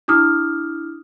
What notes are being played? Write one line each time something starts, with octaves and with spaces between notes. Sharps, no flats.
D4 E4 D6 D#6 F6